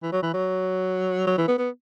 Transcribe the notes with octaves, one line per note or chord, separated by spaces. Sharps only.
E3
F#3
E3
F#3
F#3
E3
B3
B3